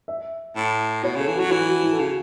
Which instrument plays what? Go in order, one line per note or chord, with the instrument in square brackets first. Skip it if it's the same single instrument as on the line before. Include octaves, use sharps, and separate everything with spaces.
[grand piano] E5
[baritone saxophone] A2
[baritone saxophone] B2 [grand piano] C#5
[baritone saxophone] C#3 [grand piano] A4
[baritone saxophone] E3
[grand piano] F#4
[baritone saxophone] F#3
[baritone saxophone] E3 [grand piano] E4
[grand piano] F#4
E4
A4
[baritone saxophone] C#3 [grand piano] F#4